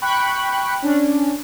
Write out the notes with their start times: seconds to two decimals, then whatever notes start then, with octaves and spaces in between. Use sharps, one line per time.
0.02 G5 B5 C#6 F#6
0.82 C#4 D4